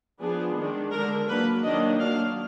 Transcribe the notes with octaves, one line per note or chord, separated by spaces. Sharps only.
F3 B3 D4 G#4
D#3 G#3 D4
D3 G#3 D4 A#4
F#3 A#3 D4 B4
D#3 F#3 A#3 D4 D#5
F#3 A#3 D4 F5